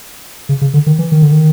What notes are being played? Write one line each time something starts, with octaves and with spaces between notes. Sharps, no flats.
C#3
C#3
D3
D#3
E3
D#3
D3
D#3